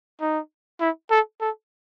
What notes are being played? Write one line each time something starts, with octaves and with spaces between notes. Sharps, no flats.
D#4
E4
A4
A4